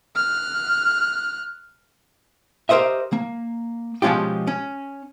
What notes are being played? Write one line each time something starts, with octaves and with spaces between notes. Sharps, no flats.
F6 F#6
G4 A#4 C5 D#5 E5
A#3
B2 F3 G#3 C#4 F4 G4
C#4